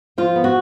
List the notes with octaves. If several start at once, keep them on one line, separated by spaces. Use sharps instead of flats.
F3 F4
B3
F#4